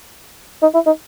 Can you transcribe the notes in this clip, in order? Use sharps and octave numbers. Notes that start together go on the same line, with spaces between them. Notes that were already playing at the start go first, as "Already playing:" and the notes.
D#4
E4
D#4